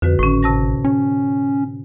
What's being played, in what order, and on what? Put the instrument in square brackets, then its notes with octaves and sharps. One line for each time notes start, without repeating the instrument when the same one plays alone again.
[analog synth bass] F2 [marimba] D3 F#4 B4
[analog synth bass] G#1 [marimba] A2 C#4
[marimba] C3 A5 A#6
[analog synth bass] C#4